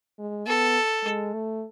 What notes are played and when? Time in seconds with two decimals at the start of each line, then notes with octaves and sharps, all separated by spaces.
0.19 G#3
0.47 B3 A4
1.04 G#3
1.34 A3